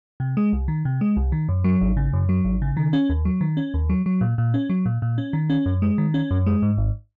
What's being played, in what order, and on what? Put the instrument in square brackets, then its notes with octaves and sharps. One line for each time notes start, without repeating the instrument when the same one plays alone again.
[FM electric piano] C3
G#3
C2
D#3
C3
G#3
C2
D#3
F#2
F#3
G#1
C#3
F#2
F#3
G#1
C#3
D#3
C#4
D#2
F#3
D#3
C#4
D#2
F#3
F#3
A#2
A#2
C#4
F#3
A#2
A#2
C#4
D#3
C#4
F#2
G#3
D#3
C#4
F#2
G#3
G#2
G#1